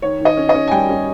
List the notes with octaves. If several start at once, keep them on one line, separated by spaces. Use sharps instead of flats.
D#3 C#5
D#3
D#5
C#4
D#5
C#4
G#5
G3 G5
C#4